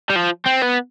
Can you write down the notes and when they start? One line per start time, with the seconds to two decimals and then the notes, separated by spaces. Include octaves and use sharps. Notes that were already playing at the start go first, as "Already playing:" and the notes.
0.10 G3
0.16 F3
0.46 C4
0.61 B3